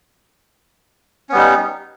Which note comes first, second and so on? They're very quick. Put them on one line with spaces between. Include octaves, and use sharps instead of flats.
C#4 B3 G3 D#4